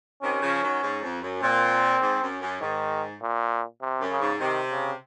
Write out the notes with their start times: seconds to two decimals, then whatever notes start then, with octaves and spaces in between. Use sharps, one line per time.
0.22 C3 D#3 C#4
0.42 C#3 F3
0.62 D#3 F#3
0.82 G#2
1.02 F2
1.21 F#2
1.41 A#2 C4
2.02 G#2
2.22 F#2
2.41 F#2
2.61 G#2 D#3
3.21 A#2
3.81 C3
4.00 F#2
4.11 C#3
4.21 G#2
4.40 C3 D#3
4.71 C#3